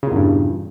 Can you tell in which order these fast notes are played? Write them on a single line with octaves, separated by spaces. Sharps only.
C#3 A#2 E2 G2